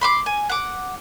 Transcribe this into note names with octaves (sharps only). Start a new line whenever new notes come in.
B5 C6 D6
G#5
F#5 D6